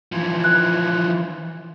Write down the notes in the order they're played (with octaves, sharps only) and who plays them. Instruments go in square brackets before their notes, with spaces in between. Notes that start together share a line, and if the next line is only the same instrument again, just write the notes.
[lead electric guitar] E3 F3
[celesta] F#6